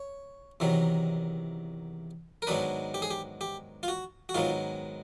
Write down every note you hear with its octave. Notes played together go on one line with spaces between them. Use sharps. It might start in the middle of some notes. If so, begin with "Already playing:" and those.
Already playing: C#5
E2 C3 D#3 F#3
A#4
G#2 D#3 F#3 B3 D4 B4
G4
G#4
G4
G4
F4
F#4
F#4
G#2 D#3 F#3 B3 F4